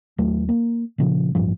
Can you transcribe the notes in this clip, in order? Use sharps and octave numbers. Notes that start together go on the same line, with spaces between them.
D#2 F#3 A3
A#3
A#2 C#3 F3
A1 G2 F3